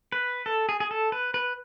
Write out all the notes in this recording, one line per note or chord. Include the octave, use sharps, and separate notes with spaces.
B4
A4
G#4
G#4
A4
B4
B4